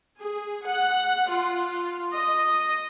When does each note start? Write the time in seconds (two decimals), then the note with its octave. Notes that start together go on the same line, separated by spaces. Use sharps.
0.20 G#4
0.65 F#5
1.29 F4
2.15 D#5